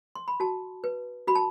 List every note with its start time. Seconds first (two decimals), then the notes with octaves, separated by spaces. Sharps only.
0.15 C6
0.28 B5
0.40 F#4 A5
0.84 B4
1.27 F#4 B5
1.35 A5